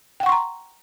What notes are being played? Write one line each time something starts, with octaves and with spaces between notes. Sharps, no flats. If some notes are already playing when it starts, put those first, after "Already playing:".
F#5 G5 A#5 C6 C#6